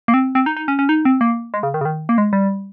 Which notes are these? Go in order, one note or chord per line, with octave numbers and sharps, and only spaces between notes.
A#3
C4
C4
D#4
D#4
C#4
C#4
D#4
C4
A#3
G#3
C#3
D#3
C#3
D#3
A#3
G#3
G3